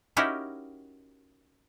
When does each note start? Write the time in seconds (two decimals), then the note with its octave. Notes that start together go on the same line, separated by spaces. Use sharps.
0.17 C#4 D#4 E4 F#4 G4 A#4